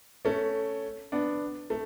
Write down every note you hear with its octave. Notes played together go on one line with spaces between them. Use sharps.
A3 C#4
B3 D4
A3